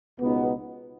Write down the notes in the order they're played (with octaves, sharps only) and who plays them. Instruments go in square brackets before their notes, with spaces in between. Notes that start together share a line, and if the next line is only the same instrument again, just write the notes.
[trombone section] C#2 B2 B3 D#4